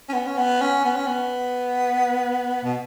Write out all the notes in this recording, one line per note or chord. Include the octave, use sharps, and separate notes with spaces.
C#4
B3
C#4
B3
C#4
B3
C#4
B3
B2